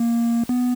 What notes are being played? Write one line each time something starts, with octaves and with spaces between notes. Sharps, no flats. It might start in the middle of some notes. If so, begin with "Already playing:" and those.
Already playing: A#3
B3